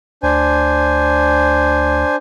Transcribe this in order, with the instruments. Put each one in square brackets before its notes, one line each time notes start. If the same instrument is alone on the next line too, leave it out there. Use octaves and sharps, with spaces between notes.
[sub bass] D2 [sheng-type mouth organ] D4 C5 G#5